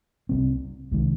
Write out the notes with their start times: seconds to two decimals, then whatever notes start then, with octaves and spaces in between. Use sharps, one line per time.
0.29 C2 C3 G3 C4
0.91 C2 C3 D#3 G#3